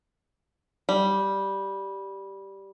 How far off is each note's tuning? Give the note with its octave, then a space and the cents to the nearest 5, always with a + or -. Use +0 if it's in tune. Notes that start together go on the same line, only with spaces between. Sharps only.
G3 -5